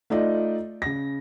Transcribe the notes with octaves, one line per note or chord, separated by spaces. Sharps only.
A3 D#4 F4 D5 D#5
C#3 A#6